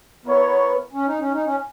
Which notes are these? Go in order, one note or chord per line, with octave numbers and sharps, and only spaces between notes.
B3 E4 A#4 C#5
C#4
D#4
C#4
D#4
C#4